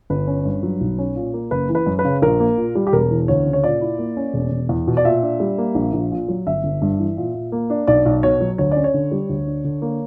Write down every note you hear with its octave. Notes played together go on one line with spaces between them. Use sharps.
G1 B4
C#4
G2
F#3
B1
C#4
A#2
A#3
F#1 B4
E3
B4
F#2
B4
C#3
A#1 A#4
A#3
A#2
G3
G4
E1 A#4
E3
D2 C#5
C#3
C#5
A#2 D5
E4
A#3
C#4
E1
E1
E2
B2
D5
A#2 E5
D4
G3
A#3
A#1
A#1
A#2
F#3
G1 E5
G1
G2
E3
A#2
A#2
A#3
D4
B1 D5
B1
B2 C#5
F#3
D2 C#5
C#4 D5
C#5
D3
G3
D2
D4
D3
A#3